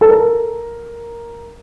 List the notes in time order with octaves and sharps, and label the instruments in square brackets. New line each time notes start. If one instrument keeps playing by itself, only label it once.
[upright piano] A4
A#4